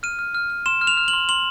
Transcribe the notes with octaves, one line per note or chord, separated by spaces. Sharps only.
F6 D#7
F6
F6
F6
C6 E7
F6
F7
F6
F#7
C6
C6 F#7